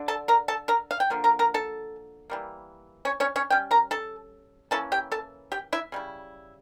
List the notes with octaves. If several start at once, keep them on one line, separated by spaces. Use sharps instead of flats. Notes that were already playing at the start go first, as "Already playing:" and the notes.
Already playing: D3 D4
A4 A5
A#4 A#5
A4 A5
A#4 A#5
F5
G5
D3 F3 A#3
A#4 A#5
A#4 A#5
A4 A5
E3 G3 A#3
C#4 C#5
C#4 C#5
C#4 C#5
G3 C#4 G5
A#4 A#5
A4 A5
E3 A#3 C#4 E4 A4 A5
G4 G5
A4 A5
G4 G5
E4 E5
C#3 G3 E4